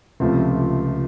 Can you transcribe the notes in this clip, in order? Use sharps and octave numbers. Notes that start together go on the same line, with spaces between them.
C#2 C3 F3 A3